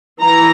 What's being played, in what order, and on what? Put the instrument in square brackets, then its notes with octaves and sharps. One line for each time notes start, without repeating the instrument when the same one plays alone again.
[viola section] E3 A#5